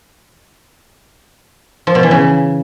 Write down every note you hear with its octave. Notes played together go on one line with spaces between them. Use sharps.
F3
B2
E3
C#3